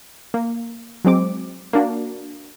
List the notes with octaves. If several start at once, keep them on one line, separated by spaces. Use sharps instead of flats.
A#3
F#3 G#3 C4 D6
A#3 D4 F#4